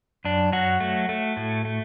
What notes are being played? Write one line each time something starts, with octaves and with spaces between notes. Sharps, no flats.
F#2 D4
F#3 F#4
A3
A3
A2
A3